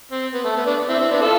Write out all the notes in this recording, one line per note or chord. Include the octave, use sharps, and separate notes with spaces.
C4
B3
A3
B3
B3 D4
C4 E4
C4 E4
B3 D4
F4 A4